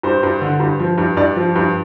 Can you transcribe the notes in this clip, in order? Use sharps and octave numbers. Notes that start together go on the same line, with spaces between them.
G2 C5
G2
D3
G2
F3
G2
G2 D5
F3
G2